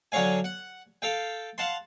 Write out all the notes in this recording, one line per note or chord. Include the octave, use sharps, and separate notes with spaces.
D3 F#3 C#5 F5 G#5
F#5
A4 F5 G5
F5 F#5 A5 C6